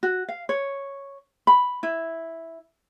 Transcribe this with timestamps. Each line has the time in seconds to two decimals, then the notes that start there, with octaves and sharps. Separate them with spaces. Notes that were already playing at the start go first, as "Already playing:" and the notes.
0.03 F#4
0.29 F5
0.49 C#5
1.47 B5
1.83 E4